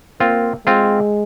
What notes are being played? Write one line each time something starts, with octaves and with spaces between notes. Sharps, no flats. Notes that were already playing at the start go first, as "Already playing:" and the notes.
A#3 C4 F4
G#3 C4 F4